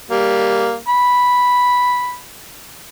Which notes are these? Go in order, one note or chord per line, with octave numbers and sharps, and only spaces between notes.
G3 A#3
B5